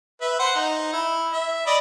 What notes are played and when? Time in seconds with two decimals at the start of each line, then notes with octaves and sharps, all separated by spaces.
0.21 B4 E5
0.39 C5 F#5 C6
0.55 D#4
0.93 E4
1.32 E5
1.66 D5 D#5 B5